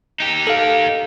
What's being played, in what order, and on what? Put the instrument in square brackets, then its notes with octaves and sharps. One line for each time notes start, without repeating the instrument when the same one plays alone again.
[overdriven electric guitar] D#4 G4
[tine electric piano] A4 F5